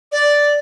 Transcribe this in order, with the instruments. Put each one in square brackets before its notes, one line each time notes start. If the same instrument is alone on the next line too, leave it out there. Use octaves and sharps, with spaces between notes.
[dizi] D5